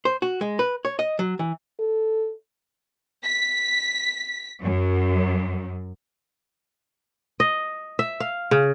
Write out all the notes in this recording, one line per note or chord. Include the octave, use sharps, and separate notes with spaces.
C5
F#4
G#3
B4
C#5
D#5
F#3
E3
A4
B6
F#2
D#5
E5
F5
C#3